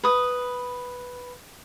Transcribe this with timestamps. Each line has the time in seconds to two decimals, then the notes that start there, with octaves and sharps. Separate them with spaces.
0.03 B4 D#6